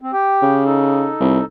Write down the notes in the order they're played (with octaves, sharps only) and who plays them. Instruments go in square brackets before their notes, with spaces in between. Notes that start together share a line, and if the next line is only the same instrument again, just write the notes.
[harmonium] C4
G4 G5
[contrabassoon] C#3
[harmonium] D#4 A4
[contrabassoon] C2